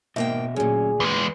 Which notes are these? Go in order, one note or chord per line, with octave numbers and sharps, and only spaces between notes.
G#2 B2 A#3 D#5 E5 G5
D2 A#2 F#3 C#4 G#4
E2 G#3 B4